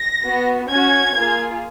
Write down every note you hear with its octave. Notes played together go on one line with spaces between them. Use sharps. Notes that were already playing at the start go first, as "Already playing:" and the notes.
Already playing: A#6
B3 F#4
C#4 F#4 G#6
A#3 F4 G#4